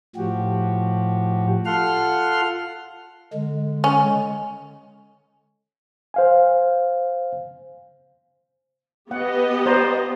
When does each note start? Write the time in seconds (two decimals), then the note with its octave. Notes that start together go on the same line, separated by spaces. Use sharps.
0.16 A2 F3 F#4 G4
1.66 F4 A4 F#5 C6 F6
3.33 D3 G#3
3.84 C#4
6.14 C5 F5 G#5
9.11 B3 G4 D#5 F#5
9.66 C5 D5 A#5